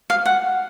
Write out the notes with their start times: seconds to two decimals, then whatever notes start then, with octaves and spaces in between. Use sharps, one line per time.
0.10 F5
0.26 F#5